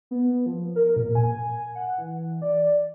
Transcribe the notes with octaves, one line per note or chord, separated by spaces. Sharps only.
B3
F3
A#4
A#2
G#5
F#5
E3
D5